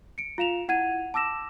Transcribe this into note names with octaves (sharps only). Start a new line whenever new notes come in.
C#7 D7
F4 F5 E7 F7
E4 F#5 G#6 D#7
A5 D6 E6 A#6 E7